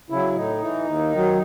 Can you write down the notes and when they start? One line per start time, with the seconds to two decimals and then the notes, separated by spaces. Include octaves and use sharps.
0.10 C#3 F#3 E4
0.35 A2 D#4
0.61 E3
0.86 D#2
1.12 D#3 F#3